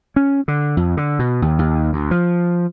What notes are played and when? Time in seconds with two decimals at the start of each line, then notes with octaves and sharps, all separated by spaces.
0.16 C#4
0.48 D3
0.77 F2
0.97 D3
1.19 B2
1.42 D#2
1.59 D#2
1.93 D2
2.11 F3